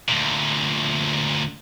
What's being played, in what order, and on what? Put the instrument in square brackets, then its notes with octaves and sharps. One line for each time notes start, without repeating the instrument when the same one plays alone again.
[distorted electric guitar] D2 A#2